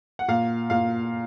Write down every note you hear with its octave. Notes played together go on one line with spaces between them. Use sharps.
F#5
A#2 F5
A#2 F5